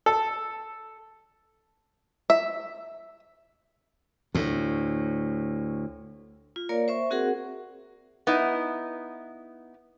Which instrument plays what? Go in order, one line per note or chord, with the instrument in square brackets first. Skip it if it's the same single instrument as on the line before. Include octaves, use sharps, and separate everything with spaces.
[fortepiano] A4
[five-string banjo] E5
[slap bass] D2 A2
[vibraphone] F4
A#3 A#4 C#5 D5 F5
C5 E5 C#6
C4 F#4 G#4 A#4 F#5
[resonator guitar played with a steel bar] B3 D#4 E4